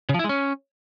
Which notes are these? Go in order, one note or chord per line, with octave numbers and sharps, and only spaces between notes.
C#3
F3
E4
G#3
C#4